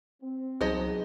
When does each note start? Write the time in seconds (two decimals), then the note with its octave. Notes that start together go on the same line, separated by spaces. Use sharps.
0.22 C4
0.61 C2 F#3 B3 D#4 G#4 C5 D#5